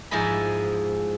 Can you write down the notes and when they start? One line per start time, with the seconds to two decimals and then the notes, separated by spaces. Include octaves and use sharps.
0.11 G#2 F3 E4 D#5 G#5 B5